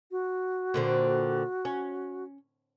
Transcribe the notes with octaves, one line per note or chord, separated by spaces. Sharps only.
F#4
A#2 D3 C4
C#4